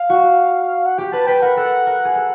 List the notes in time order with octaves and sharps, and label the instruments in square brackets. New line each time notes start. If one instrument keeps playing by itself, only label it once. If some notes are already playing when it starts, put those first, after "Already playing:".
Already playing: [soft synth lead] F5
[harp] F#4
[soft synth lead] F#5
[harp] G4 [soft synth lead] G5
[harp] B4 [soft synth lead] A5
[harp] B4 [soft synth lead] G5
[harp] A#4 [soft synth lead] F#5
[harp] A4 [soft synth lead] F#5
[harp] A#4
G#4
A4